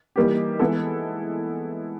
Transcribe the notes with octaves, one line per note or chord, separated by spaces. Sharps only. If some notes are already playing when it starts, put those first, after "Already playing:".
E3 G3 A#3 D#4 G4
E3 G#3 B3 E4 A4